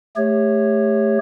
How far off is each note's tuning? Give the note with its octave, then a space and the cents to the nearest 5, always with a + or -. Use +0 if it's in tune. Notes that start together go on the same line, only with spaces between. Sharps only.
A3 -5 G4 +30 C#5 -5